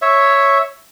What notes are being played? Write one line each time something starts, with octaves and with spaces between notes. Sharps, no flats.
C#5 E5